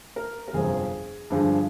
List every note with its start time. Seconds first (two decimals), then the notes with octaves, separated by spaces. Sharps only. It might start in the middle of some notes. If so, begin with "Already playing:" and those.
0.16 A#4
0.48 A#4
0.53 G1 F2 C3 F3 G#4
1.30 G2 D3 F3 G#3